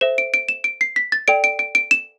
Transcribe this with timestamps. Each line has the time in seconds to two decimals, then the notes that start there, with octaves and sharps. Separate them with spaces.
0.01 A4 C5 E5 E7
0.18 D7
0.34 D7
0.49 E7
0.64 D7
0.81 C7
0.96 B6
1.12 A6
1.28 A4 D5 G5 D7
1.44 D7
1.59 D7
1.75 D7
1.91 E7